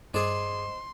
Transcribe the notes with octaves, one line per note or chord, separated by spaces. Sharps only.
G2 G#4 C5 D5 D#5 C6 E7